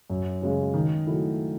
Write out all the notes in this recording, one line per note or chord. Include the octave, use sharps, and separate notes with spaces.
F#2
C#3 G#3 C#4
D#3
F#3 A3 E4